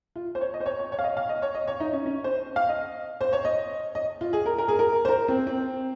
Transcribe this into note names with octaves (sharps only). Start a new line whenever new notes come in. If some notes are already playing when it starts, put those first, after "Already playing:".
F4
C5
C#5
D#5
C5
C#5
C#5
C#5
F5
D#5
F5
D#5
C#5
D#5
C#5
D#4
C#4
C#4
C5
F5
D#5
C5
C#5
D#5
D#5
F4
G#4
A#4
A#4
G#4
A#4
C5
A#4
C4
C4